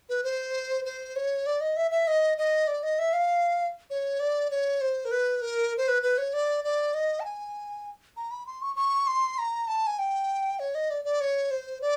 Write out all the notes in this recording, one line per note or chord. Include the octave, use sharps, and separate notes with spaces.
B4
C5
C5
C#5
D5
D#5
E5
E5
D#5
D#5
D5
D#5
E5
F5
C#5
D5
C#5
C5
A#4
B4
A#4
C5
B4
B4
C#5
D5
D5
D#5
A5
G#5
A#5
B5
C6
C#6
C#6
C6
A#5
A5
G#5
G5
C#5
D#5
D5
D5
C#5
C5
D5